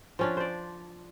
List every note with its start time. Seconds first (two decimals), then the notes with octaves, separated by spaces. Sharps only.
0.19 F3 C#4 D4
0.37 C5 D5